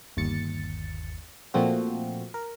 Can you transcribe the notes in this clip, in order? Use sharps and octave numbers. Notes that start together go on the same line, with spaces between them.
G1 D#2 A6 C#7
A#2 F3 A3 C4 F#4
A#4